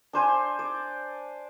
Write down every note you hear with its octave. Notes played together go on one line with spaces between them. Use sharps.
D4 C5 G#5
D5